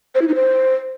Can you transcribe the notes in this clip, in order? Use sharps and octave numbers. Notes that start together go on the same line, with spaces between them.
C5
E4
D#4
C5